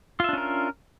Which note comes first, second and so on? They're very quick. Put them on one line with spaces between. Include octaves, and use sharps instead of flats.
F4 E5 D4 C#4 A#4